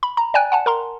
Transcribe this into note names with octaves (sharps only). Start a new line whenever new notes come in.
B5
A#5
D5 G5 G#5 F#6
F#5 G#5 A5
A#4 A#5 C6